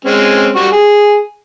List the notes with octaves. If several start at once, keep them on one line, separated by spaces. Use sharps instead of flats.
G#3 C4 C#4
G3 F#4 C#6
G#4